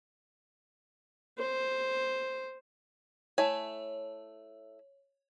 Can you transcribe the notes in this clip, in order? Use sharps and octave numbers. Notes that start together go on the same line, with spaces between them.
C5
A3 E4 C#5 G#5